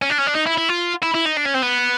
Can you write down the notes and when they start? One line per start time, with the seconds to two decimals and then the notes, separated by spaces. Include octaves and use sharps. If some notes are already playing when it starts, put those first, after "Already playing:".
0.02 C#4
0.10 D4
0.18 C#4
0.27 D4
0.35 D#4
0.47 E4
0.58 E4
0.69 F4
1.03 E4
1.14 E4
1.25 D#4
1.37 D4
1.45 C#4
1.54 C4
1.62 B3